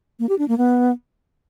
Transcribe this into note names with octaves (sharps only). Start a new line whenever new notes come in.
A#3
G4
D4
A#3
B3